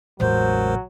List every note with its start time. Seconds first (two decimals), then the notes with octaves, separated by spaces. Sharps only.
0.20 A1 E2 C#3 F#3 G#3 A#4 C5